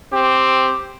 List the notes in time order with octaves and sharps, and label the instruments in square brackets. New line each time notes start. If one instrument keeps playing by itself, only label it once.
[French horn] C4 [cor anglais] G4